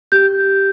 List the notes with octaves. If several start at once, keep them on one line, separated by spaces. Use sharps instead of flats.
G4 G6